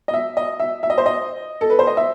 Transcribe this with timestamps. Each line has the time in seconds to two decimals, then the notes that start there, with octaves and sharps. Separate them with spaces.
0.08 D#5
0.14 E5
0.37 D#5
0.60 E5
0.83 E5
0.90 D#5
0.98 C5
1.06 D#5
1.61 A4
1.70 B4
1.79 C5
1.87 D#5
1.97 E5